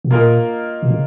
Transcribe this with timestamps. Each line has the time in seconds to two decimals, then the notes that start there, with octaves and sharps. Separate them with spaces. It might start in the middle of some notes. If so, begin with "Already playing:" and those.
0.05 B2
0.11 A#2 A#3 F4 A#4 D#5
0.83 B2
0.90 C#3